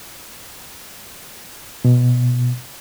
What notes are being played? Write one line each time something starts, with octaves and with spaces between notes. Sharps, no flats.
B2